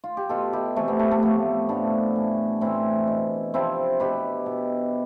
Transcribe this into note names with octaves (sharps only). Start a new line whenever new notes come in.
F4
G4
B2 F4 A4
E4 G4
C3 E3 A3
B3
A3
A3
A2 F3 B3
A2 F3 B3 D4
A2 E3
A2 E3 C4 E4
B2
C3 F3 C4 E4
B2 G4 B4
B2